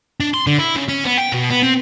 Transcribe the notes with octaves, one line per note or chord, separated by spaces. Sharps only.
D4
C6
D3
E4
C#3
C#4
B3
G5
B2
B3
C4